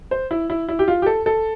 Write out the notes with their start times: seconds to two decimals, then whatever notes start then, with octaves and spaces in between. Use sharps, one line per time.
0.11 C5
0.31 E4
0.50 E4
0.68 E4
0.79 G4
0.88 F4
1.02 G4
1.06 A4
1.26 A4